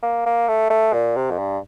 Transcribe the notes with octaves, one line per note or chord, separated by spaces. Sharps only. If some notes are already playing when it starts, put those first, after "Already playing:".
A#3
A#3
A3
A3
A#2
C3
F2
G2